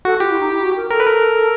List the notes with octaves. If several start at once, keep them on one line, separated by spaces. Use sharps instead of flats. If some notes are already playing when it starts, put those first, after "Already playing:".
F#4 A4
F4 G4
E4
D#4
E4
F#4
A#4
A4 A#4
B4
A#4